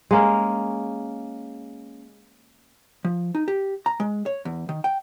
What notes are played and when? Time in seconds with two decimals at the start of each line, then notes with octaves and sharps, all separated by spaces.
0.11 G#3 A#3 C#4
3.05 F3
3.35 D#4
3.48 G4
3.86 A#5
4.00 G#3
4.26 C#5
4.45 E2
4.69 D#3
4.84 G5